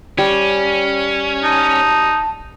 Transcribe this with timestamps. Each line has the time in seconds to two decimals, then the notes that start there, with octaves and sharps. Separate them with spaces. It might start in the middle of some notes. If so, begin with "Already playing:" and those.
0.18 G3 C#4
1.44 D#4 A5